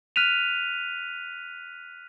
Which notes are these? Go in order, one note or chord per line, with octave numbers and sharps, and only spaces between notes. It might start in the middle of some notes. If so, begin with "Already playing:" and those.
F6 F#6 B6 D#7 F7